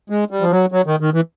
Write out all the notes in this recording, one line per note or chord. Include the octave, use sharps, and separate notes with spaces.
G#3
G3
F3
F#3
F#3
D#3
D#3
E3